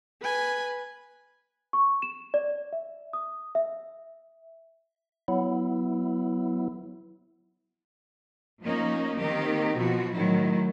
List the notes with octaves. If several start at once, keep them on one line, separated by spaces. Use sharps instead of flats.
B4 G#5
C#6
E7
D5
E5
D#6
E5
F#3 B3 E4
F3 A#3 C#4 D#4
D#3 A#3 C4 D#4 G4
B2 F3 F#4
A2 D#3 F#3 E4